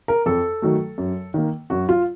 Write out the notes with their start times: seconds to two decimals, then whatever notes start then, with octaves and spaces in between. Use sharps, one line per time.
0.08 A#4
0.26 F2 A4
0.62 D#3 F#3 A3
0.98 F#2
1.34 D#3 A#3
1.70 F#2 F#4
1.89 F4